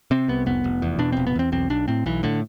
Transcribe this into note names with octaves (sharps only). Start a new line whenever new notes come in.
C3 C4
C2 B3
F1 B3
F1
E2
B2 D4
F1 C4
B3
E2 C4
B1 C4
B1 D4
A2 C4
B1 E3
A2 D3